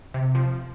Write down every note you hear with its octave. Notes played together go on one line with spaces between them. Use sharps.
C3
F3